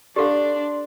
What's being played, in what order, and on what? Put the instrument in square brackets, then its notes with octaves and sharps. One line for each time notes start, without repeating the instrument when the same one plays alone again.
[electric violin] D4 [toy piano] G4 A4 F5 [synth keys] D5 C6